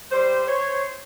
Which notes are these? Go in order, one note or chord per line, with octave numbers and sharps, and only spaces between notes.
G3 C5
C5 C#5